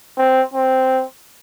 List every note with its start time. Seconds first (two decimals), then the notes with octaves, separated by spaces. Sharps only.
0.17 C4
0.54 C4